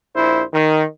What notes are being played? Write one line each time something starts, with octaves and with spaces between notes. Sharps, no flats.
A#1 E4 C5
D#3